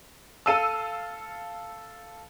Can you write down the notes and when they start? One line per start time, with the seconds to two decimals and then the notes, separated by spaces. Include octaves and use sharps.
0.46 A4 F5 A5 E6 D#7